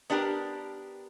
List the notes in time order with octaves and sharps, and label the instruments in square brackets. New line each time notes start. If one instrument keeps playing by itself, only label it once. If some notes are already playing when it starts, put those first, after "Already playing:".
[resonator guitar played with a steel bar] B3 D4 G4 A#4